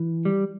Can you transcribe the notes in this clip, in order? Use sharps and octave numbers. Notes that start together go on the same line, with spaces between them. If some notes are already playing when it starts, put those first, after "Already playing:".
Already playing: E3
G3